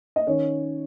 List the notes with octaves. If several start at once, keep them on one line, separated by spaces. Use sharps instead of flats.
D#5
D#3 C#4 C#5